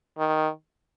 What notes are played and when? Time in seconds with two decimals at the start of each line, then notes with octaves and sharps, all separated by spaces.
0.18 D#3